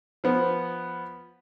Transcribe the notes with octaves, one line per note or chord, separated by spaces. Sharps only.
F3 B3